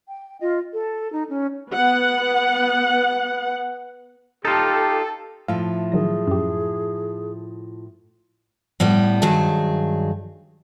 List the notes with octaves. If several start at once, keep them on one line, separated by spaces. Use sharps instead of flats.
G5
F4 D#5
A4
D#4
C#4
B3 F#5
D#4 F4 G4 A4
A2 F3 F5
D#3 F#3 G#4 A#6
F#2 G4
A2 G3 B3
G2 D#3 F#3 G#4 A5